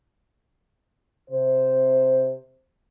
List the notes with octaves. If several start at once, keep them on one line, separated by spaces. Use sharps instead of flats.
C3 C5